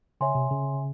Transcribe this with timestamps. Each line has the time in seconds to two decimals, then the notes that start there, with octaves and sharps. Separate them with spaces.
0.21 C#3 C#5 E5 G#5 C6
0.35 C3
0.51 C#3